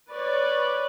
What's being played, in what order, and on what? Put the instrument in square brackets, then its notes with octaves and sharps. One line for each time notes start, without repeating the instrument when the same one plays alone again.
[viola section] B4 C#5 D5